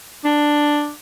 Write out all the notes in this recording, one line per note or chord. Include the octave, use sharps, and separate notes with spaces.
D4